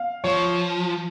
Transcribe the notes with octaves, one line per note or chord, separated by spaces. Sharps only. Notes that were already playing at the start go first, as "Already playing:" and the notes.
Already playing: F5
F3 C#5